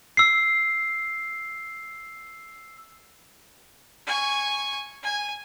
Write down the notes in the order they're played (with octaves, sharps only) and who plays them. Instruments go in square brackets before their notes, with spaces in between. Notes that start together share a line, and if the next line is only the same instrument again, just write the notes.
[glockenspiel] E6 C7
[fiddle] G#5 C#6
G#5